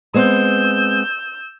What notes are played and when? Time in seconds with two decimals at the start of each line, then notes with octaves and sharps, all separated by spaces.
0.14 G#3 B3 C4 E6 G6